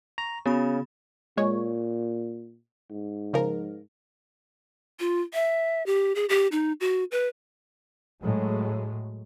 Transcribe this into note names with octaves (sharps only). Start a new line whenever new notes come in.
A#5 C#6
C#3 B3 F#4 B5
A#2 G#3 C#5
G#2
C#3 F3 A#4
F4
E5
G4
G#4
G4
D#4
F#4
B4
A2 F#3 G#3